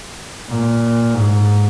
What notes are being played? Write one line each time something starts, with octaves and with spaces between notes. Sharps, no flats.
A#2
G#2